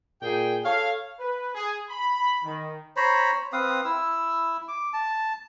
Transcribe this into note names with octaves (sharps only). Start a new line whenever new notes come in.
A#2 G#4 G5
A4 C#5 F5
B4
G#4
B5
D#3
C5 C#5 A#5 B5
C4 B4 F5 D#6
E4 E6
D6
A5